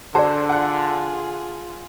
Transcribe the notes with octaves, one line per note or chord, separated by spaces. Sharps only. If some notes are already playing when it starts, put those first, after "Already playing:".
D3 F#4 G#4 C5 D5 A5
F4 G#4 F#5 F#6